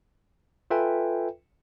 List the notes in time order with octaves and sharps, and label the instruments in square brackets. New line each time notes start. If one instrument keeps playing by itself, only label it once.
[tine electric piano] F4 A4 B4 E5 G5 G#5